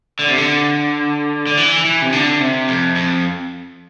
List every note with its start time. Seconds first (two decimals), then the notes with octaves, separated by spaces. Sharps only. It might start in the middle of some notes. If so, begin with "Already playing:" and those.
0.19 D3
0.29 C3
0.38 D3
1.47 D3
1.57 E3
1.85 E3
2.02 C3
2.12 D3
2.40 C3
2.68 F2
2.95 F2